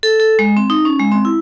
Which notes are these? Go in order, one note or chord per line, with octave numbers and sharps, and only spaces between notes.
A4
A4
G#3
C4
D#4
C#4
G#3
C4
E4